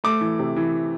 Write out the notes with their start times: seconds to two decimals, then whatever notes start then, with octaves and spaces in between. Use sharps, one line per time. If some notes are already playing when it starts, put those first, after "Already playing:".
0.04 A3 D6
0.21 E3
0.39 C3
0.56 E3